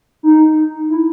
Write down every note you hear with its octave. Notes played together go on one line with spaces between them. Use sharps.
D#4
E4